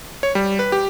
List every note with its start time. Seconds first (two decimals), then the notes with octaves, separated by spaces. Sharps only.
0.23 C#5
0.35 G3
0.59 B4
0.72 G4